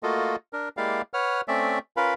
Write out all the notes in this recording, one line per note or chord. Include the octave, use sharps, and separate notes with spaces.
A3 A#3 F4 F#4 A4 D#5
D4 A#4
G#3 A#3 E4 G4 D5 F5
B4 C#5 F#5 F6
A3 C4 C#4 D5 E5
C#4 F4 A#4 B4 F5 B5